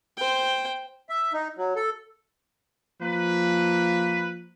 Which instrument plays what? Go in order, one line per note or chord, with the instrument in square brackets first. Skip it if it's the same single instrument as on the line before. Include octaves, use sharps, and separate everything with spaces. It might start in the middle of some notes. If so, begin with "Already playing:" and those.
[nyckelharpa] C5 G5
[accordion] E5
D#4
F#3
A4
[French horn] F3 [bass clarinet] A#3 [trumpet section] B4